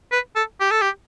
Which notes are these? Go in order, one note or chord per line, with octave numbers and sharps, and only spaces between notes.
B4
A4
G4
A4
G4